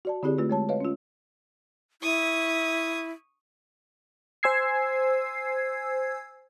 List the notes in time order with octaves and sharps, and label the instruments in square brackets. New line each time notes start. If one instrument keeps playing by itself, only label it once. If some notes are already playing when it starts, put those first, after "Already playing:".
[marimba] F#4 D5 A5
D3 C4 E4 G4 G#4 D5
A3 F4 B4
G#3 C#5 A5
B4 C#5 D#5 F5
C#4 F4
[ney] E4 [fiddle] C#6 D#6
[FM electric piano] C5 G#5 E6 G#6 C7